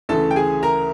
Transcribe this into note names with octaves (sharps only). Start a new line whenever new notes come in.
D2 C#3 E3 A3 A4 A5
G5
G#4 G#5
A#4 A#5